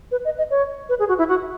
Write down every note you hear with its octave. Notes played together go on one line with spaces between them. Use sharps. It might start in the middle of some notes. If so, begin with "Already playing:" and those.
B4
D#5
D#5
C#5
B4
G#4
F#4
E4
F#4